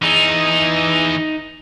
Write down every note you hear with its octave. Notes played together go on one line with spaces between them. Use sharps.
E3 D#4 G#4